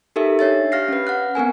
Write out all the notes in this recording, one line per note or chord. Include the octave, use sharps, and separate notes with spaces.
D#4 G4 A4 A#4 E5
D4 C#5 E5 A6
G4 F5 F6 A#6 C7
C#4 B4
F#5 F6 F#6
B3 C4 A#4 G#5